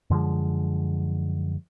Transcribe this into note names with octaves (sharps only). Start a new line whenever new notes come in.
F#2 D3 F3 G#3